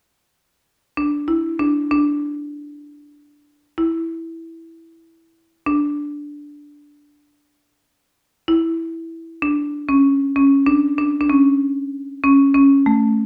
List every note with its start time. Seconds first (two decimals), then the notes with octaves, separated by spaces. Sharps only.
0.97 D4
1.28 E4
1.59 D4
1.91 D4
3.78 E4
5.66 D4
8.48 E4
9.42 D4
9.89 C#4
10.36 C#4
10.66 D4
10.98 D4
11.21 D4
11.30 C#4
12.24 C#4
12.55 C#4
12.86 A3